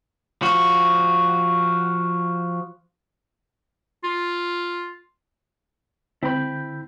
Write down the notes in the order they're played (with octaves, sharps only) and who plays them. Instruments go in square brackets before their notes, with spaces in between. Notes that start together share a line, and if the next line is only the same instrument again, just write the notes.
[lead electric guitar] F3 F#4
[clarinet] F4
[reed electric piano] D3 G6 [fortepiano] C4 [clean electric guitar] E4 B5